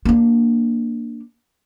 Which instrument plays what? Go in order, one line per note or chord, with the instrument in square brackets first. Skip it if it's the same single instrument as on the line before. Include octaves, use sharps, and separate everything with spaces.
[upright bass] A#3 D4